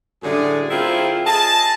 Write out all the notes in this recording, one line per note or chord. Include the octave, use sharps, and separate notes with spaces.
F#2 A2 D3 G3 G#4
C4 E4 F4 G#4 A#4
G#4 D#5 A5